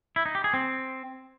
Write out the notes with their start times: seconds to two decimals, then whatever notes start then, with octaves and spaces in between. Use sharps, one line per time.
0.16 E4
0.26 D#4
0.35 G4
0.44 G#4
0.54 C4